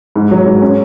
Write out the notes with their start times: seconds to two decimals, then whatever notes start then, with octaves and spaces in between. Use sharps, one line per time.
0.16 G#2
0.31 F#3
0.46 G#2
0.62 C#4